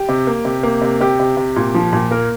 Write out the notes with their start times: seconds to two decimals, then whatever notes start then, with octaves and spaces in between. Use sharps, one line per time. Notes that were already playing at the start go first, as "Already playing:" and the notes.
Already playing: G4
0.09 C3
0.27 A#3
0.45 C3
0.63 A#3
0.82 C3
1.00 C3 G4
1.20 C3
1.37 C3
1.56 A#2
1.74 F3
1.93 A#2
2.11 A#3 A#4